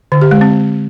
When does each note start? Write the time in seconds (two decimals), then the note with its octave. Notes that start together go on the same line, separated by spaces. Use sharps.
0.12 D3
0.22 G4
0.31 G#3
0.41 C4